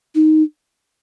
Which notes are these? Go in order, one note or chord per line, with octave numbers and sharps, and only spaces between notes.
D#4